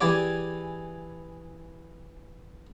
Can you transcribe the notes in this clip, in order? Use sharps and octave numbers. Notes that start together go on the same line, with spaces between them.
E3 G4 G#4 D5 G#5 D6